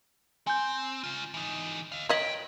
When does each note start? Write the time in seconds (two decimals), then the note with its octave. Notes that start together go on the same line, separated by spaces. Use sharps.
0.47 C4 G#5 G6
1.04 C#3 F4
1.34 E3 D#4
1.92 D#5 F5
2.09 D2 C#5 D#5 G5 G#6 B6 F#7